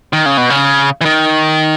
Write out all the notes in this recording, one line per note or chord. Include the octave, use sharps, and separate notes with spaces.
D#3
C#3
B2
C#3
E3
D#3